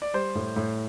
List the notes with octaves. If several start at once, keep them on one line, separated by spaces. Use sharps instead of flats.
D5
G3 C5
A2
A2